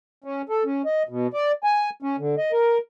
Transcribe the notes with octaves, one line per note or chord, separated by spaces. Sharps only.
C#4
A4
C#4
D#5
B2
D5
G#5
C#4
D3
D#5
A#4